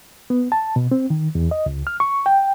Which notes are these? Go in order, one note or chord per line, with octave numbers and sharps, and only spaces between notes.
B3
A5
B2
C4
D#3
E2
D#5
C#2
F6
C#6
G5